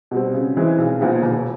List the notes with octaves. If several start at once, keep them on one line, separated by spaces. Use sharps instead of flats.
B2 G3 C4
C#3
E3 G#3 C4 E4
B1
A#2 F3 G#3 B3
E1